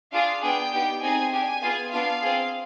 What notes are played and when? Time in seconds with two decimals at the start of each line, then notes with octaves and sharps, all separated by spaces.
0.12 D4 F4 G#4 F5
0.42 B3 D4 G#4 G5
0.72 B3 D#4 G4
1.02 C4 D#4 G#4 G#5
1.32 D4 G4 G#5
1.62 B3 F4 G#4
1.92 B3 D4 F4 F5
2.22 C4 F4 G#4